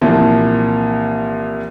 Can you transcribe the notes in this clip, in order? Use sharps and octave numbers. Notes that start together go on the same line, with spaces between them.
C2 A#2 E3 F3